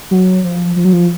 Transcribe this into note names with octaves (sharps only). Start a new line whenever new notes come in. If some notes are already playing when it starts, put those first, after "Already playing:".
F#3
F3
F3
F#3
F3